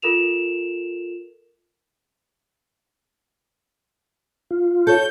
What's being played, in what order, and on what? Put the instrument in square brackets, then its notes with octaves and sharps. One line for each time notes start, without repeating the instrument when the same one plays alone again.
[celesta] F4 A4 A#4 E7 F7
[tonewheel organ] F4
[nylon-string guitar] A4 C#5 [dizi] G6